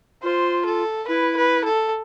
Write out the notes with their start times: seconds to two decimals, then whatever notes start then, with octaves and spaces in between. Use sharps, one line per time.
0.23 F4 C5
0.66 A4
1.08 E4 B4
1.37 B4
1.64 A4